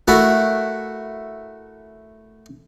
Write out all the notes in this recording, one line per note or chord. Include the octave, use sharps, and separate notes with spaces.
A3 E4 F#4 A#4 E5 F#5